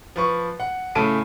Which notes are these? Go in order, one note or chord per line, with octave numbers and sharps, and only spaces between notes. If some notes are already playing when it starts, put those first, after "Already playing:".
F3 B4 C#6
F#5
A2 C#3 A3 A5 D7 D#7